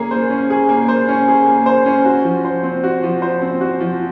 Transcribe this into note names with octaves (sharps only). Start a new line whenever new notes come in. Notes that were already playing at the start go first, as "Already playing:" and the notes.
Already playing: A#3 C#4 G#4
C5
C#4
G#4
A#3
C5
C#4
G#4
A#3
C5
C#4
F#4
F3
C5
C4
F#4
F3
C5
C4
F#4
F3